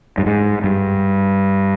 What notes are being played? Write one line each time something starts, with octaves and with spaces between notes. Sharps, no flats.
G2
G#2
G2